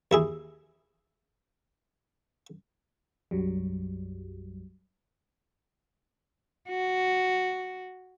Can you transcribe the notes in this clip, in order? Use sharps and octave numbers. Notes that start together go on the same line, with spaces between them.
D#2 E4 G#4
B1 F#2 F#3 G3
F#4